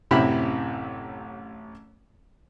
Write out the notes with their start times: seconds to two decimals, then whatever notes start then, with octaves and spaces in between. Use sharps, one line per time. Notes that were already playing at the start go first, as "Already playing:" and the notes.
0.11 A1 F#2 C3 E4 G4 B5